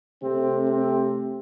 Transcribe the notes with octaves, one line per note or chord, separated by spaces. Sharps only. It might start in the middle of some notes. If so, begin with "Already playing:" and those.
C3 A3 C4
C4